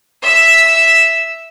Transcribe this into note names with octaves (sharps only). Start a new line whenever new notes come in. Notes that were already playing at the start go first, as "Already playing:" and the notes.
E5 E6